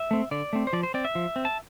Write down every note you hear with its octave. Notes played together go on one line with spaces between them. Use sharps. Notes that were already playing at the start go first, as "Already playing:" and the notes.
Already playing: E5
A3 C4
D3 D5
A3 C4
C5
F3 D5
C5
C4 D5
E5
F3
C4
A5